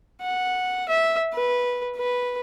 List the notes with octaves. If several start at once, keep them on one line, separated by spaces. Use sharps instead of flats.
F#5
E5
B4
B4